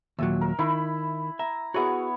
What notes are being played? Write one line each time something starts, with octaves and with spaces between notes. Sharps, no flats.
D#2 A#2 F#3 E5
A#4
D#3 E4 B5
E5 A#5
B3 E4 F#4 G#4 C#5